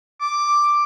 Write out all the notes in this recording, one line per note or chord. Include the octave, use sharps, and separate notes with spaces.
D6